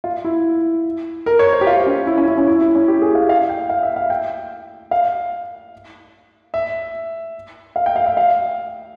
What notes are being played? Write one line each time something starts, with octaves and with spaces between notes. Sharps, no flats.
F4
E4
A#4
C#5
C5
G4
F4
C#4
E4
C#4
E4
C#4
E4
E4
C#4
G4
G#4
F5
F5
G5
F5
E5
F5
G5
F5
E5
F5
G5
F5
E5
F5